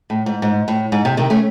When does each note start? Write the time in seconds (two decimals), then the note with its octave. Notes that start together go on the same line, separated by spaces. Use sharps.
0.10 A2
0.26 G#2
0.42 G#2
0.68 A2
0.92 G#2
1.05 C3
1.17 C3 D#3
1.30 A3 C#4